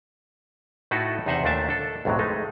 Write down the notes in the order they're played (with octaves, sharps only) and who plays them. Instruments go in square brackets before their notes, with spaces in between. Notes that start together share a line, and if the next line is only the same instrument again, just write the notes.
[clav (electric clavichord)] A2 A3 D#4 E4 F#4 A4
E2 C3 D#4 C5 E5 F#5
D#2 A#2 A3 D4 E5 A5
D4 A4
B1 F2 A2 C3 F#3
G#3 A3 D#4